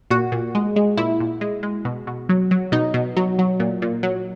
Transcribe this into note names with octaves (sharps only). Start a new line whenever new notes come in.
A#2 F#4
A#2
G#3
G#3
A#2 E4
A#2
G#3
G#3
B2
B2
F#3
F#3
B2 D#4
B2
F#3
F#3
A#2
A#2
F#3